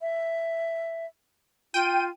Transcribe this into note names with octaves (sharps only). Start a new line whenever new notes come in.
E5
F4 G5 D#7